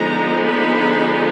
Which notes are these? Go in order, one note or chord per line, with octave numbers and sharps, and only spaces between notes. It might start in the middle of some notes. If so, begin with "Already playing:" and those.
Already playing: D3 F3 G#3 B3 D#4 A#5
B5